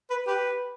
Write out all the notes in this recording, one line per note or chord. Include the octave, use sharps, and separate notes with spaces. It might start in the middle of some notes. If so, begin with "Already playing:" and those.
B4
G4 B4